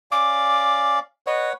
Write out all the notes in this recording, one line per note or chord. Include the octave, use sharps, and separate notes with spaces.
C#4 D5 F5 D6
B4 C#5 D#5 F#5